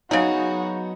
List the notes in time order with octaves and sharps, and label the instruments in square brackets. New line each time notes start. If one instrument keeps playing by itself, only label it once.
[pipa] C#3 G#4 [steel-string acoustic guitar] F#3 B3 F5 [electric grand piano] D#4 [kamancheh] F#4